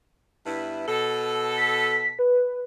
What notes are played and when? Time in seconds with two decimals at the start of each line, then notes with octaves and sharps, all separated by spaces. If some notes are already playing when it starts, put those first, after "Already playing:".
0.46 G2 B3 E4
0.88 B2 A4
1.57 B6
2.19 B4